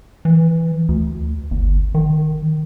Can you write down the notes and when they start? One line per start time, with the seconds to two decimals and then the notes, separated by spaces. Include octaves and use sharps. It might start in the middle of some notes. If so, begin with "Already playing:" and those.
0.25 E3
0.89 D2
1.51 G1
1.94 D#3